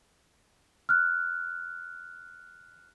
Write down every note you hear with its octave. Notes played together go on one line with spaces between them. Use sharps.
F6 F#6